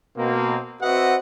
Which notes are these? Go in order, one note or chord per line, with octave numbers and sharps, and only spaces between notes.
B2 A#3 C4
C4 F#4 B4 D#5 E5 F#5